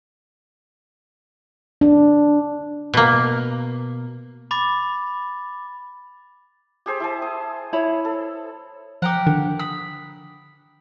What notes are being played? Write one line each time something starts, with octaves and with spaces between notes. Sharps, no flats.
D4
B2 A#3
B5 D6 A6
G4 G#4 C5
E4 G#4 A5
D#6
E4 C#5 B5
A4
F3 G4 A#4 F#5 D6
D3 D#3 D4
B5 D#6